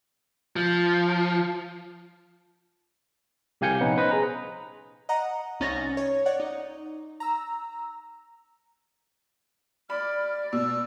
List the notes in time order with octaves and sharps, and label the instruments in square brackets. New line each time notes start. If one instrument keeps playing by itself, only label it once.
[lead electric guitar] F3
[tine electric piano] C2 G4 F5 G#5 G6 C#7
A#1 B3 C#4 D#4 B4
B4 C5 D#5
G#4 A#5
[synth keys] D#5 F#5 A#5
C2 C#4 D#4 A6 A#6
C#5
C#5 D5 F#5
D#4
A#5 E6
[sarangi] D5 [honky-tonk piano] B5 [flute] F6
[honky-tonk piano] B2 [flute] E6